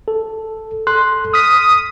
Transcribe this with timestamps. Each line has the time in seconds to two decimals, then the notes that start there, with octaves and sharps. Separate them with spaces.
0.08 A4
0.87 A4 C6 F#6
1.33 D#6 F6 B6